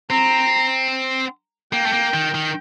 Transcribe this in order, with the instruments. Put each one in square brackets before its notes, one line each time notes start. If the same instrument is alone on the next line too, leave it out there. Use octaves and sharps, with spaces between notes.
[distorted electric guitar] C4 [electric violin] A#5
[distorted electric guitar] A#3 [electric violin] G5
[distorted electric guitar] A3
A#3
D#3
D#3